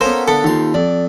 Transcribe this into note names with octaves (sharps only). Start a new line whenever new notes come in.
B3 C#4 A4 A#4 C5 F5 A#5
D3 B3 A4
D#2 D#4 F4 C6
F2 D5